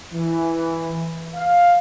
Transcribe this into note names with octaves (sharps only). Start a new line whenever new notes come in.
E3
F5